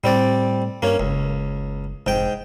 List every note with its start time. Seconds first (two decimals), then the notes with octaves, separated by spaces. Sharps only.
0.04 A2 G3 C4 D5
0.82 G2 A#3 C#4
1.00 F#1 C#2
2.07 F1 G#2 G5